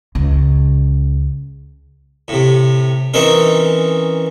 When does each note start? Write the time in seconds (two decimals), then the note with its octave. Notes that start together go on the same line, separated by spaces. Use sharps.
0.15 C#2
2.28 A2 C3
3.14 E3 C4 C#4 D#4 A#4